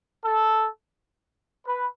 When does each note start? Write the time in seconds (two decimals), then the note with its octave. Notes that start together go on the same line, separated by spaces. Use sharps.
0.23 A4
1.64 B4